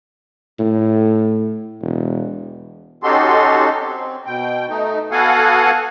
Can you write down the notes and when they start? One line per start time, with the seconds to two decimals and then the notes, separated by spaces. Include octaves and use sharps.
0.60 A2
1.82 E1
3.03 C#4 D#4 F#4 G4 A4 C6
3.80 C4
4.26 B2 G5
4.69 A3 D#4
5.11 B3 F#4 A4 F5 F#5 G#5